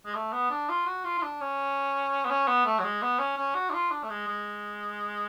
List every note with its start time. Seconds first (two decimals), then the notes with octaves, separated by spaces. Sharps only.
0.06 G#3
0.15 A3
0.33 B3
0.51 D4
0.69 F4
0.86 F#4
1.04 F4
1.19 F4
1.22 D4
1.41 C#4
2.25 B3
2.31 C#4
2.48 B3
2.66 A3
2.79 F#3
2.84 G#3
3.02 B3
3.19 C#4
3.37 C#4
3.55 F#4
3.70 D4
3.73 F4
3.91 D4
4.03 A3
4.10 G#3
4.27 G#3